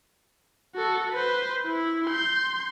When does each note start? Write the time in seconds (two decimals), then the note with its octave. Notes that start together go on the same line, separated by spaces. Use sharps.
0.75 F#4 A4
1.12 B4 C5
1.66 E4
2.07 C6 G6